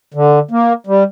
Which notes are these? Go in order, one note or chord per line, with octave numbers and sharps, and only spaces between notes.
D3
A#3
G3